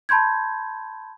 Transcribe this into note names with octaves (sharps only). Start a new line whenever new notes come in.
A5 B5 C6 G6 G#6